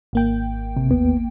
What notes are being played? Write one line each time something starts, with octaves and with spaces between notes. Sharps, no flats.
G#1 A#3 G5
C3
D#2 B3